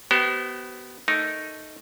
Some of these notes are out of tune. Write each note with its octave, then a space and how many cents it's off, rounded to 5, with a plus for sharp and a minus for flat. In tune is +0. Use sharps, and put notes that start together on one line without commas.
B3 +0 G4 -45 C5 +0
A3 +0 D#4 +0 A#4 +0